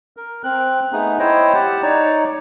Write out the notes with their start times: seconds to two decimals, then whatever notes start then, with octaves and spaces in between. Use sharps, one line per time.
0.17 A#4
0.44 C4 F#6
0.93 A3 B3 D#4 G#4
1.19 E4 C5 C#5 D#5 G5
1.54 G4 F#5 A5
1.82 D#4 C#5 D5